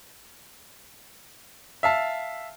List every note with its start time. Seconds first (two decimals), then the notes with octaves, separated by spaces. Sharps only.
1.83 E5 F5 A5